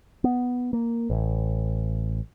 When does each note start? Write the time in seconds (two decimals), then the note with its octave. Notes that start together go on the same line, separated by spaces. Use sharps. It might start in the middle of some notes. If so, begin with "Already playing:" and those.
0.24 B3
0.73 A#3
1.10 A1